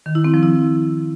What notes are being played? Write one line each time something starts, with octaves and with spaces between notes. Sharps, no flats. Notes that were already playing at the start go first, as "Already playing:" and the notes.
D#3
E4
C4
F3
E4